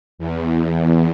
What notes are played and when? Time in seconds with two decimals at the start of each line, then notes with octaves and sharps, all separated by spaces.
0.18 E2